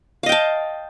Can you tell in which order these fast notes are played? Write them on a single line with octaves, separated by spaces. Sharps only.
F5 D#5 G5 A5